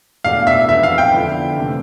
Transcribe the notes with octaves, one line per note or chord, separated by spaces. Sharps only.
E2 B2 A3 D4 F5
E5
F2 E3 B3 E4 E5
F5
G5
D3 F3 B3 E4
C3 E3 A3